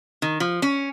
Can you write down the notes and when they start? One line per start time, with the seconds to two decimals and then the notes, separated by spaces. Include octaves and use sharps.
0.22 D#3
0.40 F3
0.62 C#4